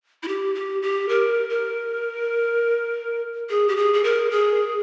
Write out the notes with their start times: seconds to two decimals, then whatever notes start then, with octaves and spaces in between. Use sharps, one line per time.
0.23 E4
0.28 G4
0.55 G4
0.82 G4
1.09 A#4
1.49 A#4
3.50 G#4
3.68 G4
3.77 G#4
3.94 G#4
4.04 A#4
4.31 G#4